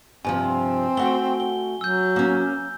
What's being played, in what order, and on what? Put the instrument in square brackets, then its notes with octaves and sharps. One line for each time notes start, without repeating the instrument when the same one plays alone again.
[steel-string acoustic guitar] G2 C3 F3 [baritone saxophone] C4 [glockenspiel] G#5
[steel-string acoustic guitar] A3 F#4 G5 [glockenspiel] G7
[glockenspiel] G7
[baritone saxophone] F#3 [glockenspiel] E6 G6
[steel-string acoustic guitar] A#3 C#4